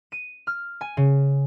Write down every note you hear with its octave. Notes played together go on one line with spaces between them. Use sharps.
D#7
F6
G#5
C#3